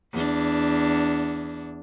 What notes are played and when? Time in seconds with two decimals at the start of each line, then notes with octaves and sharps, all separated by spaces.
0.13 E2 D4